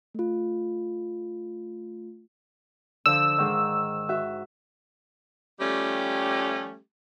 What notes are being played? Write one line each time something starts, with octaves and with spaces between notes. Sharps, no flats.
A3 F4
D3 F3 E6
G#2 D#3
F#4 E5
F3 G3 A3 C#4 G4